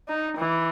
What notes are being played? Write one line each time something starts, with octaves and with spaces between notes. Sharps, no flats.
D#4
E3